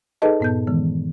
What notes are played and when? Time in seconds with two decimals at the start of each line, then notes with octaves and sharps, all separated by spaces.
0.22 D#4 G#4 A4 B4 D#5 A5
0.40 G2 A#2 B3 A5 G6
0.67 D#3 E3 G#3 B3